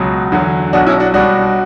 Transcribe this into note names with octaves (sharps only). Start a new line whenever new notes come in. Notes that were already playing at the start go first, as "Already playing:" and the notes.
Already playing: C#2 B2 F#3
E2 D3 F#3
B1 B2 F#3 D4 F#4
C#4 E4
D4 F#4
B1 B2 G3 D4 F#4